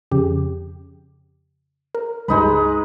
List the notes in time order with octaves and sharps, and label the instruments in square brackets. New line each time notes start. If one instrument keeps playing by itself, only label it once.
[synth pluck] F2 C#3 G4
A#4
[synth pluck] C#2 G2 G3 [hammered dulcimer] G#3 D#4 B4